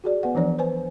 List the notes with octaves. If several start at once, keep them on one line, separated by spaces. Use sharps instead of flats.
F#4 G#4 D5
B3 B4 F#5
E3 F3 D4 C#5 D5
B4 C5 G#5